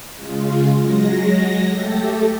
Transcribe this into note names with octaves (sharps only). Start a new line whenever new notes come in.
C#3 G#3 F4
F#3 G#3 A#6
A3 G4 A4